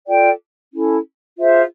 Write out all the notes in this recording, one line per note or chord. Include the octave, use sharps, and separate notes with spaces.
F4 A4 D5 G5
C#4 E4 A4
F4 G#4 C5 E5